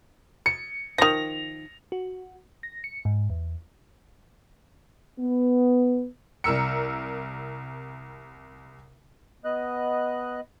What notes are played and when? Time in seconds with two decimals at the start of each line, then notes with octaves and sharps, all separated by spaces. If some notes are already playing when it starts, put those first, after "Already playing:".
0.46 C#7
0.98 D#3 F3 A#6 F7
1.92 F#4
2.63 A#6
2.84 C#7
3.05 G#2
3.30 E2
5.19 B3
6.44 C2 A#4 E6 C#7
9.45 B3 D#5 F#6